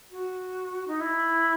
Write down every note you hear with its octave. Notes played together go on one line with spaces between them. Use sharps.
F#4
D#4
E4